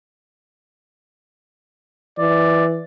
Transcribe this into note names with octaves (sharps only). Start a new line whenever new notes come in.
E3 D5